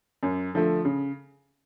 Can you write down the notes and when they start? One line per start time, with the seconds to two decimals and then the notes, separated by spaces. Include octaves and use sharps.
0.23 F#2
0.54 D3 F3 A3
0.85 C#3